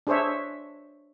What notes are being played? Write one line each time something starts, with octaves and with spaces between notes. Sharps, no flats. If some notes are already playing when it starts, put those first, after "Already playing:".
D4 G#4 C5 C#5 E5